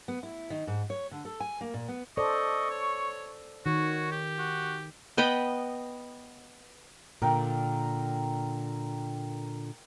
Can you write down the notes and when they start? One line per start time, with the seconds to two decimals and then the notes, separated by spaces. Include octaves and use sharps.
0.08 B3
0.23 E4
0.50 D#3
0.67 G#2
0.90 C#5
1.11 D3
1.25 A4
1.40 G#5
1.61 A#3
1.74 A#2
1.88 B3
2.17 A4 C5 D5 D#5 C#6
2.70 C#5
3.66 D#3 F#4 C#5
4.12 G4
4.39 F#4
5.17 B3 D#5 G5 B5
7.22 A#2 D3 A#4 G5